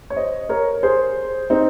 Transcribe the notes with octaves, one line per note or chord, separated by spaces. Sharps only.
C#5
C5 D#5
A#4 C#5
G#4 C5
C4 D#4